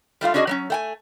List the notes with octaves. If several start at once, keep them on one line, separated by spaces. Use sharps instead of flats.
G3 A3 F4 F5
C#4 D4 F#4 G#4 B4 D#5
F#3 A#3 C#4
A3 G5 G#5